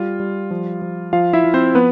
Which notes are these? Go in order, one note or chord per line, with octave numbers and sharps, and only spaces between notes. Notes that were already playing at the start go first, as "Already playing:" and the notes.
Already playing: G3 F4
G3
F3
F3
F3 F4 F5
E4 E5
F3
C4 C5
F3 B3 B4